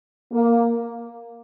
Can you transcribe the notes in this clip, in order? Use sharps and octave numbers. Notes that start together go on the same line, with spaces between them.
A#3